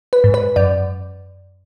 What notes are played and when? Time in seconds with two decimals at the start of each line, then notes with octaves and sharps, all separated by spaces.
0.13 B4
0.24 G#2
0.34 B4
0.56 F#2 D5